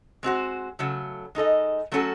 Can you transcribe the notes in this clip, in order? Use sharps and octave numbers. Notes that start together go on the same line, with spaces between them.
G#3 C4 F#4 C5
C#3 F#3 A3
G#3 D#4 A4 D#5
F#3 A3 C#4 F#4 A4